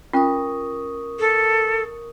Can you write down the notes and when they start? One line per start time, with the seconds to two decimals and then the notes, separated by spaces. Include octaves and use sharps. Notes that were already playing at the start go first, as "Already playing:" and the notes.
0.13 C#4 F4 A#4 C#6 D#6
1.19 A4